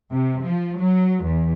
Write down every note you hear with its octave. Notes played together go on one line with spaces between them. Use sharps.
C3
F3
F#3
E2